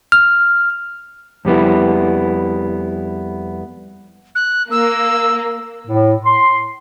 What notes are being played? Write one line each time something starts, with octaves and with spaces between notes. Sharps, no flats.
F6
F2 G3 B3 E4
F#6
A#3 E6
A2
C6